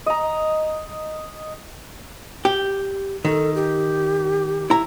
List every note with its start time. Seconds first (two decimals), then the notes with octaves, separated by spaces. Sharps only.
0.06 D#5 A#5
2.45 G4
3.25 D#3 A4
3.55 G4
4.70 E4 A#5